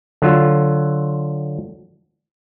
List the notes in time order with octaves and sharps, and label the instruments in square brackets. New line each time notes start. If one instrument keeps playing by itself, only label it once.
[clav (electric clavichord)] D3 F#3 F4